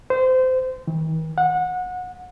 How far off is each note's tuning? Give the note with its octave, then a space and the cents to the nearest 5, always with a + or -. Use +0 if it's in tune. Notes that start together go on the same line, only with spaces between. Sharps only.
C5 -25
D#3 +45
F#5 -25